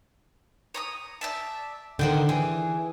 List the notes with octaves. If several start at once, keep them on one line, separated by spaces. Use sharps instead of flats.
C#5 A#5 D#6
D5 E5 A5
D3 D#3 C5 F#5 G5
E3 G#4